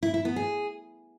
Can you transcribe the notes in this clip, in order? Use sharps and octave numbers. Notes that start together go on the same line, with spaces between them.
E4
E4
B3
G#4